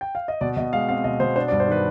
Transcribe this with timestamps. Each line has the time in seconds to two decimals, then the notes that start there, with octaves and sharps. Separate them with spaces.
0.01 G5
0.15 F5
0.28 D#5
0.41 B2 D5
0.57 B2 D#5
0.73 G#3 F5
0.89 C4 F5
1.04 B2 D#5
1.20 B2 C5
1.36 D4 C5
1.48 D5
1.52 G2
1.60 C5
1.68 D#3 B4